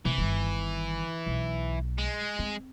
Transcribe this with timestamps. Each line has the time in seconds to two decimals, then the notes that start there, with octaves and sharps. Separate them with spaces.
0.05 C3 E3
0.18 G1 D#3
1.27 B1
1.98 G#3
2.39 C4